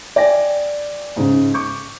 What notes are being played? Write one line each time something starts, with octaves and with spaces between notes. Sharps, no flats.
D5 G5 G#5 A#6
G#2 C#3
C#6 D6 G6